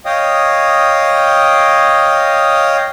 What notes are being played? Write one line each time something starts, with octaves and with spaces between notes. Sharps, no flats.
C#5 D#5 F5 G5 D#6